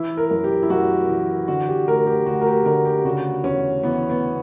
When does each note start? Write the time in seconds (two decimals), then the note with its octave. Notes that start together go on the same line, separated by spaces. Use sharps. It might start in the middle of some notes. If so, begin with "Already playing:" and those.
Already playing: E3 E4
0.17 A#4
0.31 F#2
0.44 G4
0.63 E4
0.70 F#2 F#4
1.09 E3
1.48 D3 F#4
1.68 G4
1.88 D2 A#4
2.07 G4
2.26 D2 F#4
2.41 A#4
2.46 G4
2.65 D3 A#4
2.85 G4
3.05 C#3 F#4
3.44 E2 C#4
3.83 E3 B3
4.10 B3